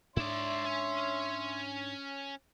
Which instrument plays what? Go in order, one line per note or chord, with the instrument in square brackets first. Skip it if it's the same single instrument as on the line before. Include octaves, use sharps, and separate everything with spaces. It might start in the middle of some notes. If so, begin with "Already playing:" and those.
[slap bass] G#2 D4 [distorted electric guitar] E4 D5 [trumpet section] C#5 E5 C6
[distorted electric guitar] C#4